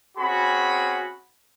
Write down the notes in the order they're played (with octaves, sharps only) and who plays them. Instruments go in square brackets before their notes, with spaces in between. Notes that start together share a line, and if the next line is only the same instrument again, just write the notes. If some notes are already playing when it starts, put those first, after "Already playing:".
[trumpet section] C4 C#4 F#4 G#4 B5